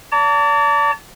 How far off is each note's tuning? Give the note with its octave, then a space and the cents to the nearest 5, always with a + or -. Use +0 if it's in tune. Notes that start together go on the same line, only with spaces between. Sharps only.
D5 -40 A5 +40